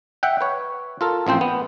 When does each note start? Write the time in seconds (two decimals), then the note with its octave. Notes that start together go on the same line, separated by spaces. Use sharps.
0.23 E5 F#5 G5
0.41 B4 C#5
1.01 F4 A4 A#4
1.26 A1 F3 C4 C5
1.41 B3